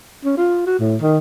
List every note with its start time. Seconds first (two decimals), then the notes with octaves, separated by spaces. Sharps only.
0.25 C#4
0.37 F4
0.67 F#4
0.79 A2
1.02 D#3